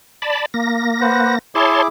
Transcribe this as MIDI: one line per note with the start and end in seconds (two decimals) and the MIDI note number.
0.22 0.46 74
0.22 0.46 81
0.22 0.46 83
0.54 1.39 58
0.54 1.39 94
1.01 1.35 71
1.01 1.35 72
1.01 1.35 78
1.55 1.88 64
1.55 1.88 68
1.55 1.82 73
1.55 1.82 81
1.55 1.82 84
1.55 1.88 86